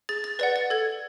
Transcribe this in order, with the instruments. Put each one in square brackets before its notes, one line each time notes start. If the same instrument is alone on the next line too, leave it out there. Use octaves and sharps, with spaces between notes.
[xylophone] G#4 A6
A6
B4 D5 F#5 A6
A6
A4 G#6